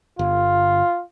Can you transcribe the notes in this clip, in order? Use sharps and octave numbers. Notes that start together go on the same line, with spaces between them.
G1 F4